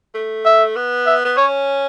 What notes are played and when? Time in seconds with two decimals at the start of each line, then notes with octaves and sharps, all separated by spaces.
0.14 A3
0.45 E5
0.76 B3
1.06 E5
1.25 B3
1.37 C#4 C#5